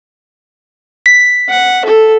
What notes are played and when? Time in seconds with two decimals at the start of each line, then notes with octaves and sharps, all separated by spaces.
1.06 B6
1.50 F#5
1.85 A4